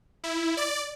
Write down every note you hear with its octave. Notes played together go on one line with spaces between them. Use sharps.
E4
D5